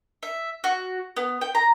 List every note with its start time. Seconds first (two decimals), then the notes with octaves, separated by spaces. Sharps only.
0.23 E5
0.64 F#4
1.17 B3
1.41 G5
1.55 A#5